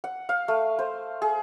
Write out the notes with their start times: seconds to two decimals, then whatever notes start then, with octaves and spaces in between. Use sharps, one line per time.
0.04 F#5
0.29 F5
0.48 A3
0.79 C5
1.22 G#4